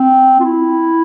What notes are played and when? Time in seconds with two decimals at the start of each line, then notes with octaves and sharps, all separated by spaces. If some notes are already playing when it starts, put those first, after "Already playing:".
Already playing: C4
0.40 F4
0.44 E4